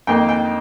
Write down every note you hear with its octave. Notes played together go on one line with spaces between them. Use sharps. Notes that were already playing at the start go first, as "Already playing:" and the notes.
F2 D#3 A#3 D#4 G5
G5